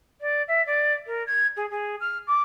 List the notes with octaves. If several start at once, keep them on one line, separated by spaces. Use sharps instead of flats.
D5
E5
D5
A#4
G#6
G#4
G#4
F6
D6